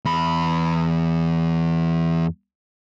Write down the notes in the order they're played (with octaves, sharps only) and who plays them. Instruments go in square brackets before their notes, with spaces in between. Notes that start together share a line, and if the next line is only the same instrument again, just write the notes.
[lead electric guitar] E2 B5